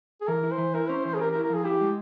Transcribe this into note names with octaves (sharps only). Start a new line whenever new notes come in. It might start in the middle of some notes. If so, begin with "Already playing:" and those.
G#4
E3 A#4
E4
C5
E3
E4 A#4
C#4 C5
E3 C5
G#4
G4 A#4
A#4
E4
A#4
F3 G#4
E4 G4
G#3